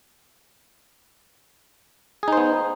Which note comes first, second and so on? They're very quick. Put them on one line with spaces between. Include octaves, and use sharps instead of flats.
G#4 D#4 C5 B3